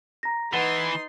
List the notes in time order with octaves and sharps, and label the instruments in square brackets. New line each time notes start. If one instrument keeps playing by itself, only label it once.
[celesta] A#5 A#6
[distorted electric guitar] E3 [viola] D#4 C6 [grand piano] B4 F#5 [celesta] A6